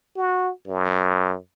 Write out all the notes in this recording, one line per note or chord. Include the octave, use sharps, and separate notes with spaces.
F#4
F#2